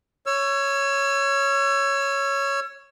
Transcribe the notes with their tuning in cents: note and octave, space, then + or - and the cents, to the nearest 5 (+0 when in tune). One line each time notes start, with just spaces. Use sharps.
C#5 +0 E6 +40